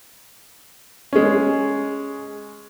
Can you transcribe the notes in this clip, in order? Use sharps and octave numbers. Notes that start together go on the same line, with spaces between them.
G#3 C#4